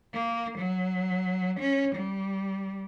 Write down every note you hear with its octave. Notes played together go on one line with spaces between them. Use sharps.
A#3
F#3
C#4
G3